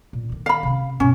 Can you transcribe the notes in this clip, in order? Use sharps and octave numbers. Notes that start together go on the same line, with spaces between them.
A#2
D3 D#3
F5 B5
C3 C#4
G2 B2 C#4